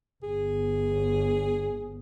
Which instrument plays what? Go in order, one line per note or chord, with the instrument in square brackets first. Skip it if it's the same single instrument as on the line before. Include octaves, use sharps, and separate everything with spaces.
[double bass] G1 [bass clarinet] G#4